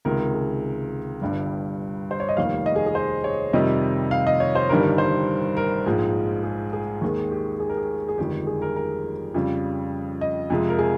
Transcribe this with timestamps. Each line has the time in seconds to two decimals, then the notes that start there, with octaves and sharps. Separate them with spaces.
0.05 C#2 C3 D#3 G#3 A#4
0.20 A#4
0.34 G#4
1.21 G1 G2 G3
2.11 C5
2.20 C#5
2.29 D#5
2.37 F1 D#2 D#3 G3 F5
2.66 D#5
2.76 G#4
2.86 G#4
2.95 C5
3.24 C#5
3.53 F2 C3 D#3 G3 D#5
4.11 F5
4.27 D#5
4.40 C#5
4.55 C5
4.69 G1 G2 D#3 G3 A#4
4.98 C5
5.57 A#4
5.86 A#1 G#2 F3 G#3
6.43 G#4
6.73 G#4
7.01 D#2 D#3 G#3
7.31 G4
7.60 G#4
7.69 A#4
7.77 G#4
8.08 G#4
8.18 G1 F2 D#3 G#3 G4
8.47 G#4
8.62 A#4
8.76 A#4
9.34 F2 C#3 G3
10.21 D#5
10.50 F2 C3 F3 G#3
10.69 A#4
10.79 G#4